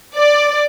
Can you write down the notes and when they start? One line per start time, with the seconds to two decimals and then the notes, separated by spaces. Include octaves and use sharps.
0.14 D5